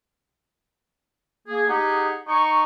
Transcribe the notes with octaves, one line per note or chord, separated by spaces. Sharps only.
A#3 G#4
D#4 G4 G#4 F#5
D#4 C#6